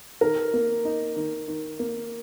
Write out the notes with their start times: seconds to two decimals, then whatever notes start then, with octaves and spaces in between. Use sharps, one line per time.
0.21 D#3 A#4
0.53 A#3
0.85 D#4
1.16 D#3
1.48 D#3
1.79 A#3